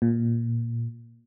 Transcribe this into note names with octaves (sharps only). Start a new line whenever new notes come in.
A#2